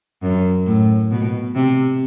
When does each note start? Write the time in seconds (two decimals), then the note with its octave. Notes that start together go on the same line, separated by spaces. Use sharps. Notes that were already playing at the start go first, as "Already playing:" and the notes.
0.23 F#2
0.66 A2
1.11 B2
1.55 C3